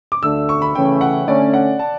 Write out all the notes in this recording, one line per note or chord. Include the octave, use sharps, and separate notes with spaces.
D6
D2 D3 A3 D4 E6
C#6
B5
C#3 E3 A3 C#4 E4 G5
F#5
D3 A3 C#4 D5
F#5
A5